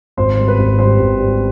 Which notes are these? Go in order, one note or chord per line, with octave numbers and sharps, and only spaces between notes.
G#1 C5
G3
B4
G#1
G3 C5
G#1
G3